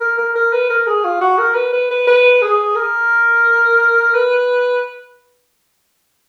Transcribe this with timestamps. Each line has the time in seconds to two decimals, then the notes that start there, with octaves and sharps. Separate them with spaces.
0.01 A#4
0.18 A#4
0.35 A#4
0.53 B4
0.70 A#4
0.87 G#4
1.04 F4
1.21 F#4
1.38 A#4
1.55 B4
1.73 B4
1.91 B4
2.07 B4
2.42 G#4
2.76 A#4
4.15 B4